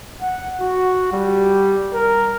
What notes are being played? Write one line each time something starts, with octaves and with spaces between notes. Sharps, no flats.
F#5
F#4
G3
A#4